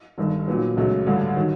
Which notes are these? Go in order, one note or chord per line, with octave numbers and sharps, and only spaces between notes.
G1 G2 D#3
A#2 F#3 B3
C#2 C#3 F#3 A3
A1 G2 D3
D#3 F#3